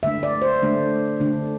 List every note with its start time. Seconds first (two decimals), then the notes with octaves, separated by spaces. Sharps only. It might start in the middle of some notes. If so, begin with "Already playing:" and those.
0.03 D3 A3 D4 E5
0.23 D5
0.42 C5
0.62 D3 A3 D4
1.20 D3 A3 D4